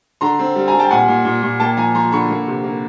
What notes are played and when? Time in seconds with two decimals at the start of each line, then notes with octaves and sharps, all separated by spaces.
0.21 D3 A#5 C6
0.39 C4
0.55 G3
0.68 G#5 A#5
0.73 G3
0.79 G5 A5
0.91 A#2 F#5 G#5
1.08 A#2
1.25 A#2
1.43 A#2
1.60 A#3 G5 A5
1.77 F3 G#5 A#5
1.95 F3 A#5 C6
2.12 D3 B5 C#6
2.30 A#3
2.48 C3
2.64 A#3